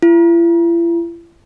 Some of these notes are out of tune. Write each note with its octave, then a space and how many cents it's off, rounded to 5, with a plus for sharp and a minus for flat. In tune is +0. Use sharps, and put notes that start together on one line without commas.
E4 +45